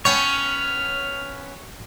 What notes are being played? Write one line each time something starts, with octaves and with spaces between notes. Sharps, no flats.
B3 C#4 C#5 G5 A5 C#6 F6